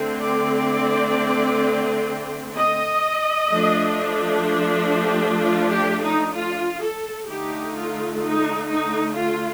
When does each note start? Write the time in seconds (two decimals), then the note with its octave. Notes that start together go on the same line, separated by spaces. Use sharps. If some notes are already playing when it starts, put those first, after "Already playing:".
Already playing: D3 A3 C4
0.21 D5
2.56 D#5
3.51 F3 A3 D4
4.92 G4
5.39 F4
5.70 G4
6.02 D#4
6.33 F4
6.81 A4
7.28 D3 A3 D#4 G4
7.74 F4
8.22 D#4
8.69 D#4
9.16 F4